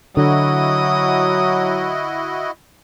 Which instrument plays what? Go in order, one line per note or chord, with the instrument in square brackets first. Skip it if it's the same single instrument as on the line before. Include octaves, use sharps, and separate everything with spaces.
[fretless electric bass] D3 [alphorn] F#3 [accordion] E4 F#4 D#5 [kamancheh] D#6